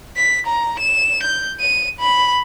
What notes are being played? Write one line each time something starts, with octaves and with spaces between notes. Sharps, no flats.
B6
A#5
E7
G6
D#7
B5